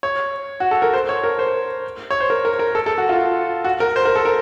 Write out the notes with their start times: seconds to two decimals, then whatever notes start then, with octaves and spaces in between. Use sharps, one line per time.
0.03 C#5
0.60 F#4
0.71 A4
0.82 A#4
0.94 C5
1.09 C#5
1.24 A#4
1.39 C5
2.10 C#5
2.20 C5
2.30 A#4
2.45 A#4
2.59 A#4
2.75 A4
2.86 A4
2.98 F#4
3.09 F4
3.64 F#4
3.80 A#4
3.96 C5
4.05 A#4
4.15 A4
4.25 A#4